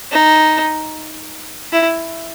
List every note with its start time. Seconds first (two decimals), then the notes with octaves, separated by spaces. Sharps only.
0.11 D#4
1.72 E4